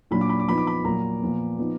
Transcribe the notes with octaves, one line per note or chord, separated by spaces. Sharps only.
A#2 F#3 D4 B5
D6
B5
D6
F3 B3 D#4 B5
D6
B5
A#2 F#3 A#3 A#5
A#2 F3 B3
F3 B3 D#4